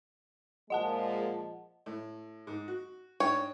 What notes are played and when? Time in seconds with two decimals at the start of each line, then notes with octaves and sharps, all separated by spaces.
0.70 A#2 F3 G#3 D#5 F#5 A5
1.86 A2
2.47 G#2
2.68 F#4
3.20 G#2 D4 C#5 G5